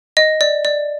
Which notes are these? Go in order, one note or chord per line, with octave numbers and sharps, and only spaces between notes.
D#5
D5
D5